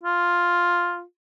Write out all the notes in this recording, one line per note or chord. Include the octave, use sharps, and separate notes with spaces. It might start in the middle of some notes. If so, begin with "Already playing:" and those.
F4